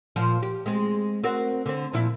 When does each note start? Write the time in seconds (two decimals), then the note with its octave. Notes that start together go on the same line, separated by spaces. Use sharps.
0.16 A#2 F3
0.42 G4
0.66 G#3 C4
1.24 C4 F#4 A#4
1.66 D3 C4
1.93 A#2 F3 E4